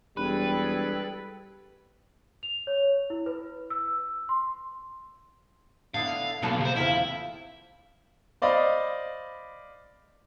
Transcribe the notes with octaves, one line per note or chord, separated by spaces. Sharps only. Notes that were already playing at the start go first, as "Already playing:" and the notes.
E1 G3 G#4 A4 B4 G5
F7
C#5
E4
B4
E6
C6
D3 B3 E4 F5
B1 A#3 B3 A4
C3 C5
E2 C4 E4 F4
C5 D5 D#5 F5 B5